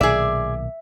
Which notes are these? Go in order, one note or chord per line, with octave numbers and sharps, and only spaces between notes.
B1 A#2 D#3 G#4 D5 E5